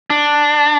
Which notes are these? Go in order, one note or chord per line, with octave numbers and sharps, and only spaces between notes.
D4